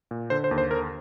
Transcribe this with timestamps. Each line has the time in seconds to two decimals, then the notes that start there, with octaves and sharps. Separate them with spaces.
0.11 A#2
0.30 D3 C5
0.44 C5
0.51 D#2
0.58 C5
0.71 D3 A#4